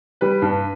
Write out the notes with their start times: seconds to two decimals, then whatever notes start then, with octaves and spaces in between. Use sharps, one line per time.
0.21 G3 B4
0.42 G2